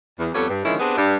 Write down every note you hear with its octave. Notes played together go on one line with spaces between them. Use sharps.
E2
F2 G3 B3 G4 A4 C#5
G2
D3 D#3 F3 G#3 C#4 E4
B3 C4 D4 G4 G#4
G2